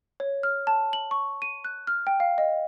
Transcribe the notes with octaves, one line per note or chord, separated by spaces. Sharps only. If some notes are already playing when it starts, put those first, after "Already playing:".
C#5
F6
A5
F#7
C#6
D#7
F#6
F6
G5
F5
D#5